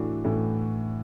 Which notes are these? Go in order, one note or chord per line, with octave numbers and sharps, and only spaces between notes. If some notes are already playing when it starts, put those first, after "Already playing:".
Already playing: A2 E3 D4 F#4
A2 E3